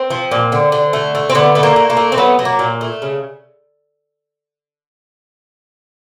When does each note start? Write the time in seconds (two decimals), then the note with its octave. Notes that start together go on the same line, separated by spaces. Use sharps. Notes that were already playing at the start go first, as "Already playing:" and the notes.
Already playing: C4
0.10 F3
0.31 A#2
0.52 D3
0.72 D3
0.93 A3
1.15 A3
1.30 C4
1.35 D3 B3
1.55 A3 B3
1.63 A#3
1.76 A3
1.90 A#3
1.97 A3
2.12 C4
2.17 F#3 B3
2.39 F#3
2.45 A#3
2.59 A#2
2.81 A3
3.02 C#3